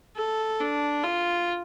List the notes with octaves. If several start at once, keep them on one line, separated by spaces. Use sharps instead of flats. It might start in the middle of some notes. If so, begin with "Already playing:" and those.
A4
D4
F4